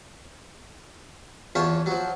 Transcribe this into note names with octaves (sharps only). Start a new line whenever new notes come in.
E2 F4 C#5 A5
F3 F#3